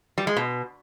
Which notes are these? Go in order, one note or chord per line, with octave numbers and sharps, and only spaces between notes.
G3
G#3
B2